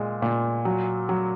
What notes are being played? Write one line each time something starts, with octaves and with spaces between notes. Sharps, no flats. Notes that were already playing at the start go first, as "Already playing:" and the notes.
Already playing: A#2 G#3
A#2
F#3
F#3